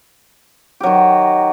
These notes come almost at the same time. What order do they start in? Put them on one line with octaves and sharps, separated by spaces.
G4 F#3 D#3